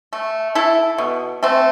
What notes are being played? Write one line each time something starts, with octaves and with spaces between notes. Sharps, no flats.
A3
E4 A4
B2
A3 C4